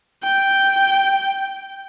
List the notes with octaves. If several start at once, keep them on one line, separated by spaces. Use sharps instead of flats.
G5